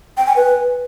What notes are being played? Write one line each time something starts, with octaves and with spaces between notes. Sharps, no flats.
G5
G#5
B4